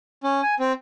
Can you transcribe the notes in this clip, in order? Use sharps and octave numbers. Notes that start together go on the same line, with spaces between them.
C#4
G#5
C4